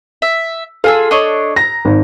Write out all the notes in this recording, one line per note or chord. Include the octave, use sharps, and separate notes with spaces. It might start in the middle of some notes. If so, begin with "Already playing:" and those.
E5
F4 G#4 A4 E6
D4 C#5 D#5
A#5 A#6
G#1